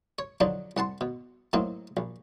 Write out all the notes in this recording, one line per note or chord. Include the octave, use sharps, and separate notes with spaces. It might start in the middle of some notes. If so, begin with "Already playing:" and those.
C#5
D3 F3 F#3 D4 D#4
C2 F#5 A5 C6
B2
A2 F#3 A#3 C4 D#4
A#1